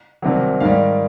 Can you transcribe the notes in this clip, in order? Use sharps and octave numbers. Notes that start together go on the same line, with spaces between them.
C2 C3 D#3 F#3
G#2 D#3 G3 F5